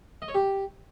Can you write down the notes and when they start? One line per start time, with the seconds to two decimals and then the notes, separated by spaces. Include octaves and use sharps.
0.22 D#5
0.28 C#5
0.34 G4